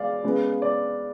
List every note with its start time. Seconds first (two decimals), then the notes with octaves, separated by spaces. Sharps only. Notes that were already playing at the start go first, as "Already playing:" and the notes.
Already playing: G#3 B3 D5 F5
0.24 C#3 G#3 B3
0.62 D5